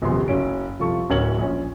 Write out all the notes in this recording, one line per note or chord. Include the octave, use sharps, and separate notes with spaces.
D#1 A#1 F#2 C3 B3 C6
F#1 F#3 C#4 D7
C2 F2 F4 A4 C#6
D1 D2 A#4 C#5 G#6 F#7
A#1 C#4